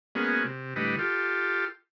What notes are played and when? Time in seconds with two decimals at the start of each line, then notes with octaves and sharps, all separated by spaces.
0.15 G#3 A#3 B3 C#4 F#4
0.44 C3
0.76 A2 D3 G3 B4 D#5
0.99 F4 G4 A4